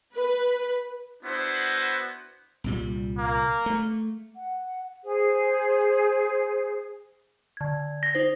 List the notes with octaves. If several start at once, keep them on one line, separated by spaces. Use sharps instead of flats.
B4
B3 D4 E4 F#4 C5
C2 A#2 G3
A#3
A3
F#5
G#4 C5
D3 G#6
A#6
D#4 C5